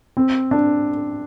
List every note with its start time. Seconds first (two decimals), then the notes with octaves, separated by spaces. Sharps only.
0.17 C4
0.51 D4